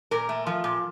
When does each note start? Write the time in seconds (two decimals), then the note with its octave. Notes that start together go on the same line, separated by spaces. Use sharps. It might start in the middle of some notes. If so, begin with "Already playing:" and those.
0.11 A#2 A#4
0.29 A3
0.47 F3
0.64 A#2